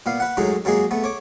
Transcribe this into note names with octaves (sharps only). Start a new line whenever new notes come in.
A#2 B3 F5
B4 F#5
F#2 A2 F#3 G#3 D#4
F#2 F#3 G#3 A#3 G#4
A3 B3
C#5 D6